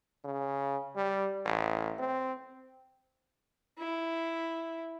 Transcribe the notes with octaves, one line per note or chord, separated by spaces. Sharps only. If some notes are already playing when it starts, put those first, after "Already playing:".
C#3
G3
A1
C4
E4